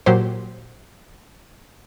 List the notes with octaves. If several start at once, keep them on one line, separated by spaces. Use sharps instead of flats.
A#2 F#3 G4 C5